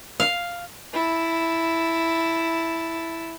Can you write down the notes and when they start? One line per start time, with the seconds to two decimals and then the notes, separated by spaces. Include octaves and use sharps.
0.20 F5
0.93 E4 A5